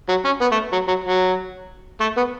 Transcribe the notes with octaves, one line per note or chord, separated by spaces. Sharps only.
F#3
C#4
B3
A3
F#3
F#3
F#3
A3
B3